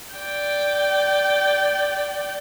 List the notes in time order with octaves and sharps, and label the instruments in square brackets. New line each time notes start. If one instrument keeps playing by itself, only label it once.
[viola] D5 G5